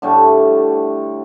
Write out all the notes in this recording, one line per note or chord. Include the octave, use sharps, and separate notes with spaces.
A2 D3 G3 A3